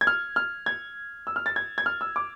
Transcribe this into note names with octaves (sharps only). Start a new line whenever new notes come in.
G#6
F6
F6
G#6
E6
F6
A6
G#6
G#6
F6
E6
D6